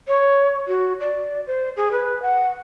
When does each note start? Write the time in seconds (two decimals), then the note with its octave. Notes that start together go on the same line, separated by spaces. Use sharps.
0.08 C#5
0.68 F#4
1.00 D5
1.47 C5
1.76 G#4
1.92 B4
2.22 F#5